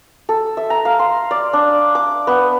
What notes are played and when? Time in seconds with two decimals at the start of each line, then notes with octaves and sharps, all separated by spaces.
0.29 A4
0.57 E5
0.70 A#5
0.85 F5
0.99 C6
1.31 D5
1.53 D4
1.95 D6
2.27 B3